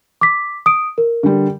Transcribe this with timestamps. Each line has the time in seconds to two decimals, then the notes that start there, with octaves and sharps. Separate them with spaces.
0.21 D6 B6
0.66 D#6 D7
0.98 A#4
1.23 D3 G3